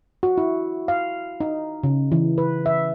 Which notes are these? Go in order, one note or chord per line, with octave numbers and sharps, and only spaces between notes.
F#4
E4
F5
D#4
C#3
E3
B4
E5